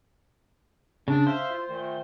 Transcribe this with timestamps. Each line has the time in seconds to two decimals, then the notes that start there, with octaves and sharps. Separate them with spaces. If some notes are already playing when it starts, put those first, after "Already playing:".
1.08 C#3 D4
1.27 C5 E5 F5
1.51 F4
1.69 A#2 D#3 A3